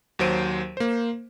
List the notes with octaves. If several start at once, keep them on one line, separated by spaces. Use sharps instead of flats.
D#2 F#3 C5 D7 D#7
A#3 C5